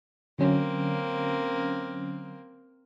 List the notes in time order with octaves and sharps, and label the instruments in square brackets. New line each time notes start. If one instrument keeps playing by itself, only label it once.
[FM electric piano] D3 F#3 C#4 [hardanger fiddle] A#3 C4